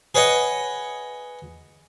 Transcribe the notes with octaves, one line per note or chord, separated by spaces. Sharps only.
G#4 B4 C#5 D#5 F#5